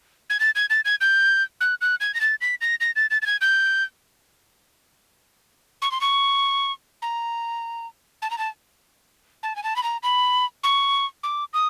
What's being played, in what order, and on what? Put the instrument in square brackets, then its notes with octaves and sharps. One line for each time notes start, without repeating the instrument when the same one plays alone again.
[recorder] G#6
A6
G#6
A6
G#6
G6
F#6
F#6
G#6
A#6
A6
B6
A#6
A#6
A6
A6
A6
G#6
G6
C#6
C6
C#6
A#5
A5
A#5
A5
A5
G#5
A5
B5
A#5
B5
C#6
D6
D#6